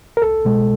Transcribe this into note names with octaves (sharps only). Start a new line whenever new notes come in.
A#4
C2 A4
B2 G#3